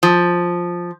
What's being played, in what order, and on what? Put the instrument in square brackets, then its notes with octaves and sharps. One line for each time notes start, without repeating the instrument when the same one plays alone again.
[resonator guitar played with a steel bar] F3